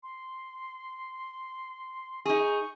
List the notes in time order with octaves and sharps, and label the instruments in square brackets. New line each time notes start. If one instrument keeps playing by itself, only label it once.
[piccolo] C6
[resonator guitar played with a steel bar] D#4 G#4 [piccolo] C#6